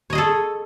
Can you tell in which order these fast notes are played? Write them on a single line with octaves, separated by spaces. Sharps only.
C#5 D#5 G#4 A4